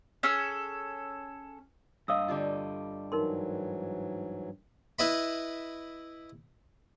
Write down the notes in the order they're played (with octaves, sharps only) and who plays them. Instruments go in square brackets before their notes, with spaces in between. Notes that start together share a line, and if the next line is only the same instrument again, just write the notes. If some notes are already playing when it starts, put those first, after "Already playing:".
[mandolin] C#4 G#4 A4 E6
[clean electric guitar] G2 D#5 [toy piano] F5 D#6 E6
[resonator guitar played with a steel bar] D3 G3 F4
[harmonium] G#2 E3 F#3 [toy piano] D#4 A#4 C6
[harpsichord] E4 B4 D#5 E5 B5